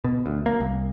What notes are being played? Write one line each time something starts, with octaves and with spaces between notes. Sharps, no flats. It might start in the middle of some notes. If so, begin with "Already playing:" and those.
B2
D2
A#3
C2